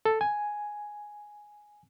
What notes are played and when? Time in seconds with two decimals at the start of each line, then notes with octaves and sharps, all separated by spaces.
0.05 A4
0.21 G#5